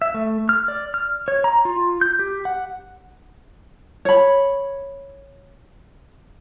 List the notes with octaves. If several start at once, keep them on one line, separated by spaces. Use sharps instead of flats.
E5
A3
F6
D5
F6
C#5
A#5
F4
G6
G4
F#5
C#5 B5